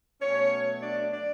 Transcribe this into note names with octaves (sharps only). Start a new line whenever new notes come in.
B2 F#3 A3 C#4 C#5
D4 D5
D4 D5